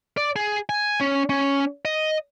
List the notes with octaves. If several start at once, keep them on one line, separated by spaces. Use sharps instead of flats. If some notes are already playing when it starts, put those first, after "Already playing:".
D5
G#4
G#5
C#4
C#4
D#5